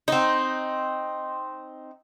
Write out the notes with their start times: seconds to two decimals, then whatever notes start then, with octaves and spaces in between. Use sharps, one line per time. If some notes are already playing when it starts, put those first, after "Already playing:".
0.08 C4 D#4